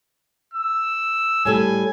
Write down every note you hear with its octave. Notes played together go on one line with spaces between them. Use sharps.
E6
A2 G3 A4 G#5